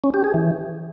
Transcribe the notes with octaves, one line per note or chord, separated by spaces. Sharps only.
C#4
G4
G#4
E3